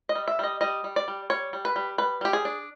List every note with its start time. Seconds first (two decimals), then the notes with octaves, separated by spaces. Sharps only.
0.09 D#5
0.15 G3
0.28 E5
0.39 G3 D#5
0.61 G3 D#5
0.84 G3
0.96 D5
1.08 G3
1.30 G3 C#5
1.53 G3
1.65 B4
1.76 G3
1.98 G3 B4
2.21 G3 G4
2.33 G#4
2.45 D4